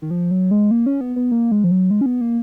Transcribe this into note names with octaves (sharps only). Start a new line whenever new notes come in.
D#3
F3
F#3
G#3
A#3
C#4
B3
B3
A#3
G#3
F3
F#3
G#3
C#4
B3
A#3